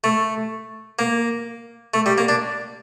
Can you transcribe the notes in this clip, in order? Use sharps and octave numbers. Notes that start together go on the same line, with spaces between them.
A3
A#3
A3
G3
A#3
D4